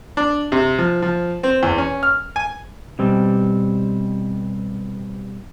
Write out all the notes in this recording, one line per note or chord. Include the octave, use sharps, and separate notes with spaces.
D4
C3
F3
F3
C4
E2
C#4
F6
G#5
B2 G3 C4